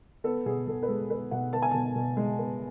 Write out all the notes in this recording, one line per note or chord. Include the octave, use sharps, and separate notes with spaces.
B3 A4
B2 G#4
B2 A4
B4
G#3 A4
B3 B4
B2 F#5
B3 A5
G#5
B2 A5
B2
G#3
B3